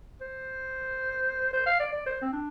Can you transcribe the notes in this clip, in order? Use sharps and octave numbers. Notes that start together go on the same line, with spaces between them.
C5
C5
F5
D5
D5
C5
C4
D4